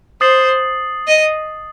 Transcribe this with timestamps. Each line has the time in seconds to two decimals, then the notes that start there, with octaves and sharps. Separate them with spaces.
0.21 C5 D#6 A6 C7 F#7
1.08 D#5